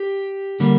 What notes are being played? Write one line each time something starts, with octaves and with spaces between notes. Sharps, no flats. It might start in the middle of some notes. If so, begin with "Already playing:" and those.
Already playing: G4
D3 G3 A#3